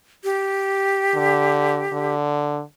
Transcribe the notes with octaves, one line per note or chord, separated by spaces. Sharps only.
G4
D3
D3